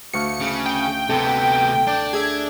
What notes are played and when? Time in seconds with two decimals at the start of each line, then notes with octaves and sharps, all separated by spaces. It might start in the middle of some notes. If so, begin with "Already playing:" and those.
0.13 D2 F5 C#6 C#7
0.40 C#3
0.66 G5
1.09 C3 B3 A4
1.87 D4
2.13 G#4 E5 G#6